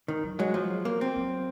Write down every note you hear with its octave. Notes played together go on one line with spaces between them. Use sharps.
D#3 G#3
F#3
F#3 G#3
F3 F#3
A#3
C4
F#3